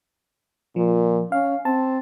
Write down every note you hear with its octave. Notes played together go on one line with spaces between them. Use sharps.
A#2 F3
C#4 F5
C4 A5